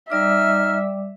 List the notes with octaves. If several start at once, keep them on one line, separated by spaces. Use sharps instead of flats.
G3 D#4 D5 E5 D6 F6